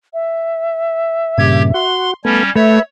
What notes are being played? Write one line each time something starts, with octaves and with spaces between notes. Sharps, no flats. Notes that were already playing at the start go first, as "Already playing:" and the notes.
E5
G2 A#2 C#3 G4 G#6
F#4 C6
G3 A3 B3 C#4 G#6
A3 B4 C#5 E5